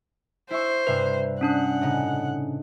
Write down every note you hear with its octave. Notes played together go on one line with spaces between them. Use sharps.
E4 C5 E5 C#6
G2 C3 B4 E5
C#4 D4 F#5 F#6
A2 C#3 D#4